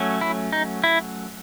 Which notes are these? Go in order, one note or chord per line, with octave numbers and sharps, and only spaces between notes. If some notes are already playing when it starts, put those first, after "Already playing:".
Already playing: F#3 A3 C#4
E4
D#4
E4